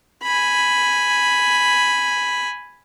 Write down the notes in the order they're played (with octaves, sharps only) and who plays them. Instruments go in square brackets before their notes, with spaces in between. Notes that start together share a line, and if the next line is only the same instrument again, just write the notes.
[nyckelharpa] G#5 B5